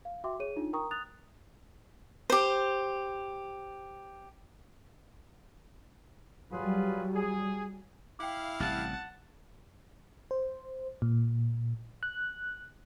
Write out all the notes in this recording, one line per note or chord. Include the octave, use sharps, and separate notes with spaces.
F5
F#4 E5 G5 C6 D6
G#4 C#5 D#7
D4 D#4 F4
A#4 G5 A#5 C#6 D#6
D#6 F#6 A6 F7
G4 C5
F#3 G3 F4 G#4 B4
G#4
E4 F5 G5 D6
A1 C3 G3 F#5 A5
C5
A#2
F#6